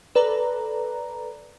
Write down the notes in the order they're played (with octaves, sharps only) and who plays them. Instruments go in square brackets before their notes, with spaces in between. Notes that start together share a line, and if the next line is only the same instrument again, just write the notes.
[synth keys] A4 B4 D5 A#5